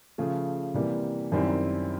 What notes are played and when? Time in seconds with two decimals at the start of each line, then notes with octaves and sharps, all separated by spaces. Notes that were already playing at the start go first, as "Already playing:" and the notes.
0.18 C#3 F3 A3
0.74 C3 E3 G3 A#3
1.32 F#2 D#3 G3 C4 E4